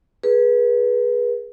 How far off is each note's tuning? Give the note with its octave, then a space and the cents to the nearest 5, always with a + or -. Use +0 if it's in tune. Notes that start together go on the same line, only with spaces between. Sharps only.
G#4 +0 B4 -25